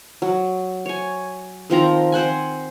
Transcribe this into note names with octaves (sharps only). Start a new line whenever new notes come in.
F#3
C#5 G#5
D#3 F3 C4 A#5
C4 C5 F#5 G#5